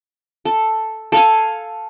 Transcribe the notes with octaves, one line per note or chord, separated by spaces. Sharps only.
A4
A4 F5 G#5